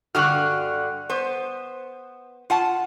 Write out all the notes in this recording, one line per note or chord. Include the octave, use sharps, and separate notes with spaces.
G2 D3 F#4 F6 F#6
B3 C5
F4 F#5 A5